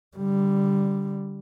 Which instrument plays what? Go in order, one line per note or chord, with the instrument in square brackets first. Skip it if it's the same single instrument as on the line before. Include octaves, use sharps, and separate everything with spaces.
[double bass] D3 G3